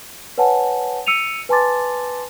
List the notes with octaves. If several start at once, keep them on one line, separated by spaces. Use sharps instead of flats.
B4 C#5 F#5 G#5 A5
E6 C#7 D#7 F7
B4 G#5 A5 C6 D6 A6